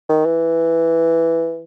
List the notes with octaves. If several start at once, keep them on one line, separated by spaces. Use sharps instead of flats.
D#3
E3